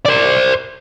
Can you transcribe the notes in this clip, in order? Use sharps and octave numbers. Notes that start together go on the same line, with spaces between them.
C5 D5